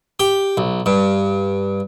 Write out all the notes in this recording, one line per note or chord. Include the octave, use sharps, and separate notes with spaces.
G4
B1
G2